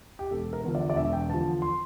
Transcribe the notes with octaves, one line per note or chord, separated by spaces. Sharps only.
G4
E1 A4
A#4
E2 D3 F3
D5
D5
E1 E5
G5
E2 D3 F3 A5
C6